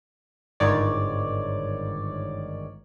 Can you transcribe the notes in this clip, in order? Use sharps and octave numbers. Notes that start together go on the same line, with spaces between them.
G1 G#2 D#3 C#5 D5